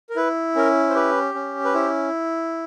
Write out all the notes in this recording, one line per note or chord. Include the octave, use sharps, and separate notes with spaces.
A#4
E4 B4
C#4 A#4
C5
G4 B4
C#4
B4
E4 C5